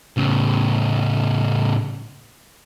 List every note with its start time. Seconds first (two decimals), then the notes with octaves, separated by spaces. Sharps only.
0.17 A2 C#3